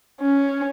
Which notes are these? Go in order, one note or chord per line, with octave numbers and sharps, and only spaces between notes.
C#4